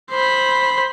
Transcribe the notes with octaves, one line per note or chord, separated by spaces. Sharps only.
C5 B5